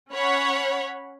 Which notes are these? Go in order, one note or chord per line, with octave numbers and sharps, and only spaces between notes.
C#4 C#5 F#5 B5